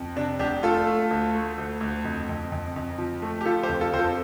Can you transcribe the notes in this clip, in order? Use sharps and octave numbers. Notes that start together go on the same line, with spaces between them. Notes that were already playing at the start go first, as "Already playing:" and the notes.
Already playing: F2
C3 D4
F1 D4 G4
A3 F4 A4
A3
D2
A3
D2
D2
F2
F2
F2
F2
F3
A3
G4
F3 F4 A4
G4 C5
F2
F4 A4
F2 C5
F4 A4